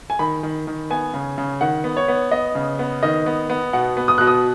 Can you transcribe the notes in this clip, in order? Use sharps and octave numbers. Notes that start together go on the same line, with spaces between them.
G#5
D#3 B5
D#3
D#3
B3 G#5
C#3
C#3
D#3 F#5
B3
C#5
B3
B3 D#5
C#3
B3
D#3 D#5
B3
B3
B2 F#5
B3
D#6
B2 F#6
D#6